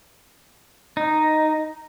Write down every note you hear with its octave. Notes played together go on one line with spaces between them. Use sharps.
D#4